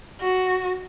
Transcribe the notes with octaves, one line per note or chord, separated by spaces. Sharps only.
F#4